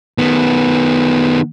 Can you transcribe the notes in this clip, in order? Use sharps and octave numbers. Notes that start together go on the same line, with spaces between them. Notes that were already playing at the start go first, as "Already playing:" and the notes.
D#3 B3